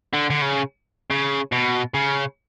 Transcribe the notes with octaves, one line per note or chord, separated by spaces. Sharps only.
D3
D3
C#3
C#3
B2
C#3